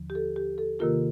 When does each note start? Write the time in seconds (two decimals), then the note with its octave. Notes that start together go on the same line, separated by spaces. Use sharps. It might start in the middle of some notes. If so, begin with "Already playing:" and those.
Already playing: D#2 D3 F3
0.10 G4
0.15 A4
0.36 G4
0.58 A4
0.79 C3 D#3 A#3 F4 G4 A#4